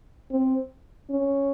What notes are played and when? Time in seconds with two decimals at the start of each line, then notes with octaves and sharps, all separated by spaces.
0.31 C4
1.10 C#4